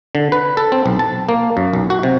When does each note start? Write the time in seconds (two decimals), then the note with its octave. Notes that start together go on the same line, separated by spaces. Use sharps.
0.15 D3
0.32 B4
0.57 A4
0.72 C4
0.86 B1
0.99 A5
1.29 A#3
1.57 F#2
1.73 B1
1.90 F#4
2.03 C3